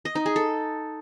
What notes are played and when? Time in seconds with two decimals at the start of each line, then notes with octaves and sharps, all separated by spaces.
0.05 D#5
0.15 D#4
0.26 G#4
0.36 A4